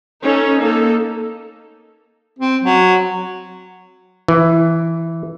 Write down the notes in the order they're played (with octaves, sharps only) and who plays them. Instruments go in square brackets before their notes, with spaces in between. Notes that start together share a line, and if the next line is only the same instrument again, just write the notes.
[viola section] C#4 D#4 A4
A#3 D#4 A4
[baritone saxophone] C4
F#3
[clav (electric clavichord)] E3